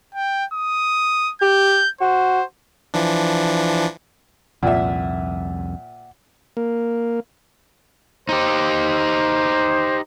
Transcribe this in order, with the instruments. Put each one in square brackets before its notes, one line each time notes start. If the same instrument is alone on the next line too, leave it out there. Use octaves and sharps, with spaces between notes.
[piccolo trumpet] G5
D#6
[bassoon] G4 [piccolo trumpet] G6
[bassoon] F#4 [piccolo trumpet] C5
[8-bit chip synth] E3 F3 D4
[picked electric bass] C2 F2 [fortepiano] A#2 E5 [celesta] F#5 G5
[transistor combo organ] A#3
[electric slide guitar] D#4 G4 [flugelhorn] C5